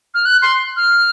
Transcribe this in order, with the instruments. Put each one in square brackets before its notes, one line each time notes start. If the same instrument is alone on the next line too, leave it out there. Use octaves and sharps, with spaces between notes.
[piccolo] F6
F#6
C6
F6